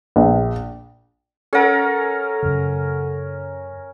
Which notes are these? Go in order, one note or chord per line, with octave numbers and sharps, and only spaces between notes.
A#1
C#4 A4 A#4 F#5 G#5 A6
F#2 C#3